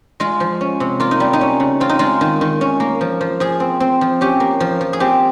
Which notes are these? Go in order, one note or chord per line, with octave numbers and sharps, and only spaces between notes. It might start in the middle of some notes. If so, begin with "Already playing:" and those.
G#3 F4
F3
C#4
C3
A#3 F4
D#4
G3
D#4
C#4
C#3
C4 F4
D#4
G#3 F4
D#3
D#3
C#4
A#3
F3
F3
F3 G#4
C4
C4
F3
C#4 G4
A#3
F3
F3
G#4
C4 G4